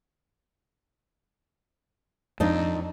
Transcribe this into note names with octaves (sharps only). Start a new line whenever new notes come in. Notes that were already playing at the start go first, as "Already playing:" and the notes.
F2 D4 D#4